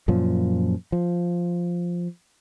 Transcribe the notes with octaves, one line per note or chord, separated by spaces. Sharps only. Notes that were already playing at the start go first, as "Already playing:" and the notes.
F#2 A#2 F3
F3